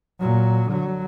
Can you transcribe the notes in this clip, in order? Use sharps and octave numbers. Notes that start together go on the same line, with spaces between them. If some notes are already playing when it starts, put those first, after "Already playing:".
A#2 F#3
D3 F#3